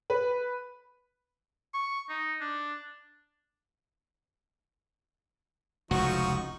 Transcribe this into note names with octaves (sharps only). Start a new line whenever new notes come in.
B4
C#6
D#4
D4
F1 C#2 A2 F3 D#4 F#4 C#6